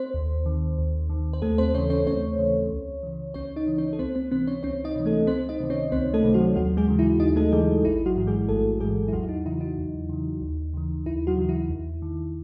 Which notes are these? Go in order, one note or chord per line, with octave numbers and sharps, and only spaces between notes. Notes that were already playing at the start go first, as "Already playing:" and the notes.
Already playing: C4 C5
D#2
D#3
D#2
D#3
C5
D#2 A3 A4
C4 C5
C#3 E3 C#4 C#5
C#4 C#5
D#2 C#4 C#5
C#3 E3
C#2
C#3 E3
C#2 C#4 C#5
D#4 D#5
C#3 E3
C#4 C#5
A4
C#2 C4 C5
C4 C5
C3 E3 C4 C5
C#4 C#5
C#2 C#4 C#5
D#4 D#5
C3 E3
A3 A4
C#2 C4 C5
D#4 D#5
C3 D#3
C#4 C#5
C#2 C4 C5
A3 A4
C3 D#3
F#3 F#4
D#2 F#3 F#4
G#3 G#4
C#3 E3
E4
D#2 D#4 D#5
A3 A4
C#3 E3 G#3 G#4
A1 E4
F#3 F#4
G#2 E3
G#3 G#4
A1 A3 A4
G#2 E3 G#3 G#4
E4
E2 F#3 F#4
E4
D#4
C#3 E3 E4
D#4
E2
C#3 E3
D#2
C#3 E3
D#2 E4
F#3 F#4
C#3 E3
E4
E2
D#3